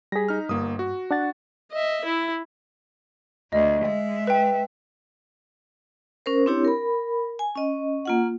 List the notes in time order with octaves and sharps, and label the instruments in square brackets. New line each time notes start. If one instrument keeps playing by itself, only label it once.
[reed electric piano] G3 G#4 [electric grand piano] A#6 B6
[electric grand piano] D#4 F6
[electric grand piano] G1 A#3 D#6 [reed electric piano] G2
[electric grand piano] F#4
[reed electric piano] D4 F#5 A6
[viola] D#5 E5
E4
[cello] D2 [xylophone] D#5
[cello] G#3 E5
[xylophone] B4 G5
[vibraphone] C#4 A#4 C5
C4 D4 E4 G4 C#5
A#4 B5
G#5
C#4 D#5
A#3 F4 F#5